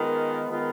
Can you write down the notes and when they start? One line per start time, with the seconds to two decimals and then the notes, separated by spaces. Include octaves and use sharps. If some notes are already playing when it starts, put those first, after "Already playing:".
Already playing: D#3 G#3 B3 F4 A#4
0.48 D#3 G#3 B3 F4 A#4